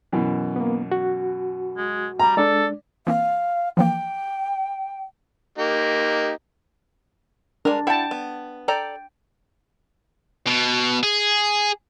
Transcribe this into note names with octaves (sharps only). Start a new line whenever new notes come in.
F#2 B2 E3
A#3 B3
F#4
G#3
G3 A#5
G#3 D4 A4 D5
E3 A#3 C4 F5
E3 F3 A#3 G5
A#3 D#4 G4
G#3 D4 A#4
E4 F#5 G5 A5
B3
A4 D5 G5 A#5
B2
G#4